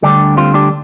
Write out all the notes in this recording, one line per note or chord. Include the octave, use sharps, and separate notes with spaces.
D2 D3 G3 D4 G4
C4 F4
D4 G4